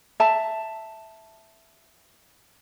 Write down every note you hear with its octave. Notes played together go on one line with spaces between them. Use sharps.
E5 A5 A#5